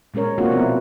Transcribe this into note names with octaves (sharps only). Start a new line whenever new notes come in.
A#2 G#3 C#4 A#4 C#5
A#3 C4 D4 F4 F#4
B2 F3 B3 E4 A#4